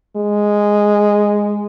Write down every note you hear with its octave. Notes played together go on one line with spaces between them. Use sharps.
G#3